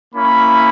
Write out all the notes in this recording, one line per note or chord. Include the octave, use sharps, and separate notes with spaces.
A#3 C#4 E4 B5